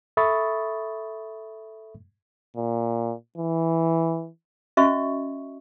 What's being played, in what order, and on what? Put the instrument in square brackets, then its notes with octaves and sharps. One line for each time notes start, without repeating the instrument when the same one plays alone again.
[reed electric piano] A4 E5 B5 C#6 D#6 A6
[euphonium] A#2
E3
[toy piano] C#4 F#4 D#5 E5 C#6